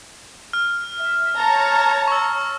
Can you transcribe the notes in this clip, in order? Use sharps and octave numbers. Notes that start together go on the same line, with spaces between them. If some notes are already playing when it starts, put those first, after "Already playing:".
F6
E5
C#5 A5 A#5
C#6 E6